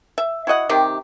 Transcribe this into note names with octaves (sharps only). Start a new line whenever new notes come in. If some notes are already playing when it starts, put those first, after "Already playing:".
E5
E4 F#4 D#5 F#5
C3 D#3 G4